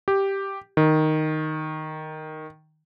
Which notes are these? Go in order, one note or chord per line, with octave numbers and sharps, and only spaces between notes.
G4
D#3